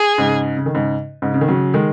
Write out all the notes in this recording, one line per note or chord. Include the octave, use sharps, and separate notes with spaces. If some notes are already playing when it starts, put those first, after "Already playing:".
Already playing: G#4
G#2 C#3
C#3
D#3
G#2 C#3
G#2 C#3
C#3
D#3
C#3 F#3
D#3 G#3